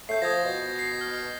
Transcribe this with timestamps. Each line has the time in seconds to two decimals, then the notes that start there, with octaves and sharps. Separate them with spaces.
0.09 A3 G6 C7
0.22 F3 D#6 G#6 A#6
0.45 B2
0.79 C7
1.01 F6